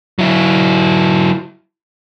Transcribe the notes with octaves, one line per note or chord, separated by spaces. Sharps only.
F#3 E4